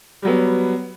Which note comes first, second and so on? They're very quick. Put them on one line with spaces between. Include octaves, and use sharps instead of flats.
G3 F#3 B3